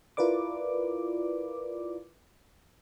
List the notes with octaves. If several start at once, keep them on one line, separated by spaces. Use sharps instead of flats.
E4 F4 A#4 B4 D5 D6